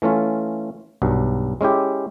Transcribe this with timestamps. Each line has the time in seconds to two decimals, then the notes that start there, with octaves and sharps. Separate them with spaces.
0.02 E3 A3 C#4 F4
1.02 B1 G2 F#3
1.61 G#3 C#4 E4 G4